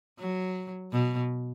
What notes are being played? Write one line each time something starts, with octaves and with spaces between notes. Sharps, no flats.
F#3
B2